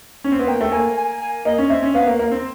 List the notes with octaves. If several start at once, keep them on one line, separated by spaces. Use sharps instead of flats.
C#4
C4
B3
A#3 G5
A3
A#3 G#5
G#5
G#5
A#3 D#5
C#4
C4 E5
C#4
B3 F5
A#3
A#3
C4